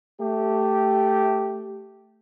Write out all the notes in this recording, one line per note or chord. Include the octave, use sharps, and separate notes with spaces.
A3 G4